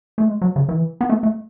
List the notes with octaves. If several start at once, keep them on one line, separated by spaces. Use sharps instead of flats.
A3
G#3
F#3
C#3
E3
B3
A3
A3